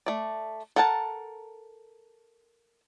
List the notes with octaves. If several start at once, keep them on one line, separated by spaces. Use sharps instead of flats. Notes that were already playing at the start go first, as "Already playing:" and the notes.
A3 D5
A4 A#4 F#5 G#5 A5